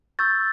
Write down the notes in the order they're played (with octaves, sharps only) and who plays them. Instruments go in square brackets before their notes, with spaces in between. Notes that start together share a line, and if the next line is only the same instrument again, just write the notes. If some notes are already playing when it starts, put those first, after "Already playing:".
[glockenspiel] C#6 E6 G6 A6